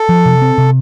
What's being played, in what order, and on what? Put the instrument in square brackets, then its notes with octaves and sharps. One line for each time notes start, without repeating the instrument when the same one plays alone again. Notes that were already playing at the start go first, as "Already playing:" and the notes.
Already playing: [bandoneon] A4
[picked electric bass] F3
C3
C4
C3